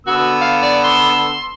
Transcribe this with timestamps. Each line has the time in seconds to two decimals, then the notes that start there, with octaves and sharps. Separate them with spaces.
0.07 D3 B3 F#4 E6
0.41 F5
0.62 D5
0.84 C6